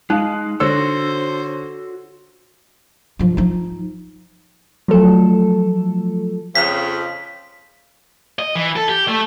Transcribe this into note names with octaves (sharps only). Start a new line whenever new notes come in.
G#3 D#4 F5 F#6
D3 F#4 A4 C5 C#5 E6
G2 F3
F3 D#4
F3 F#3 A3 A4
F2 C#3 B6
D#5
E3
A4
G4
A3